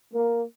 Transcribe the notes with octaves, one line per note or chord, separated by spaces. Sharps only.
A#3